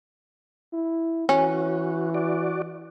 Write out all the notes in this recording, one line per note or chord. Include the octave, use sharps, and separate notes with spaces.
E4
E3 C#4 F#4
F#4 D5